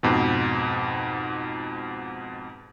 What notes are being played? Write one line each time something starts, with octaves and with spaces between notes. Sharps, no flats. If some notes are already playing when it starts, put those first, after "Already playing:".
F2 G#2 B2